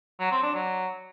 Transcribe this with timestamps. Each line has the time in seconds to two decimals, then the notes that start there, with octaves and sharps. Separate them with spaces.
0.20 F#3
0.31 C4
0.43 D4
0.54 F#3